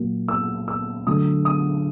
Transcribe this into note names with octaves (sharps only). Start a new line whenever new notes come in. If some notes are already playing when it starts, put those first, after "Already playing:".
Already playing: A#2 F#3 A#3
E6
E6
D3 F#3 A3 D#6
D#6